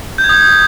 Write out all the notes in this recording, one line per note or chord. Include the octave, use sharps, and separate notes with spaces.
G6
G#6
D#6